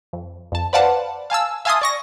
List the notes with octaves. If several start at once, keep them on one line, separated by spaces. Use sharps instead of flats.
F2
F2 A5
B4 C5 D5 F5 F#5 A5
F5 G#5 A5 E6
E5 F5 G#5 A5 C6 D#6
D5 C#6 A#6